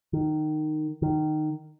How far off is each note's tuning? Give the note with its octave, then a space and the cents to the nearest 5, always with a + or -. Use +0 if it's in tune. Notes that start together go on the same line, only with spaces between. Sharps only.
D#3 -15
D#3 -15